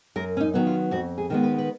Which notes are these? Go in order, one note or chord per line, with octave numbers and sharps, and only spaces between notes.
F#2 A#4
C#4
D#4
D#3 F#3 B3
F4
F2 F#4
G#4
D#3 G#3 B3
B4
B4